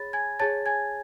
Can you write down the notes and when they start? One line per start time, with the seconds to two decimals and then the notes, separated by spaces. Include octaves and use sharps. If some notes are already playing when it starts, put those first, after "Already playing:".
Already playing: G#4 C#5 B5 A6
0.13 G#5 G#6
0.40 G#4 C#5 A5 A6
0.66 G#5 G#6